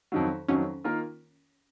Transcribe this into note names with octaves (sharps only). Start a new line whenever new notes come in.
F2 D#3 F#3
F2 D#3 F#3 C#4
D#3 A#3 F4 A#4